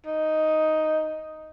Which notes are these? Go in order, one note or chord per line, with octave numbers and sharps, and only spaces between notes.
D#4